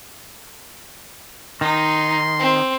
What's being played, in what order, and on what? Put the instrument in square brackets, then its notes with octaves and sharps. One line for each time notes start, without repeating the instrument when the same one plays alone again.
[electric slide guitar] D#3 [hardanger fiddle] D#4 [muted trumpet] C6
[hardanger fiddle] C4